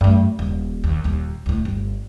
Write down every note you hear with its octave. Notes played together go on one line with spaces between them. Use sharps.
F#2 A3
D#1
D#2
D#1 D#2
D2 A2
G1